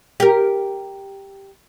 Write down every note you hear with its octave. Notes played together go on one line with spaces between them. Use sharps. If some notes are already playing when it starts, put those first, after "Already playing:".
G4 A#4